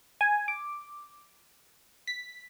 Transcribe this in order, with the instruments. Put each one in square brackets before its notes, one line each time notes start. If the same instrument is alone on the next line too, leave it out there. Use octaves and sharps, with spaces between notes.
[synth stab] G#5
D6
B6